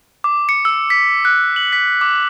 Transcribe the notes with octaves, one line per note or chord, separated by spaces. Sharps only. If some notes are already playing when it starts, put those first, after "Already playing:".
D6
C#7
E6
B6
F#6
F#7
B6
D6